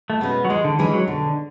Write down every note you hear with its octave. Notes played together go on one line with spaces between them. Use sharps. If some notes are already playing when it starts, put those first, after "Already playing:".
A3
B2 G#3 B3 C#4 F#4
F#3
E3 G#3
D3
E3 G#3 C#4 G#4
F#3
B2 D3